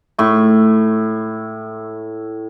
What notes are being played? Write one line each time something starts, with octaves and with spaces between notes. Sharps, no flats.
A2 C#6